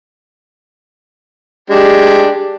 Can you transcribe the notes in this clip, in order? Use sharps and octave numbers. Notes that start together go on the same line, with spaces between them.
G#3 D4 G4